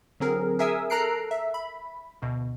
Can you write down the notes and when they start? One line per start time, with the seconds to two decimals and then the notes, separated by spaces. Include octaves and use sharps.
0.20 D3 F#3 C4 G#4 A#4
0.59 G#4 A#4 E5 G#5 D#6 E6
0.90 A4 A#4 A#5 F#6 C7 D7
1.31 E5
1.54 B5
2.22 D2 B2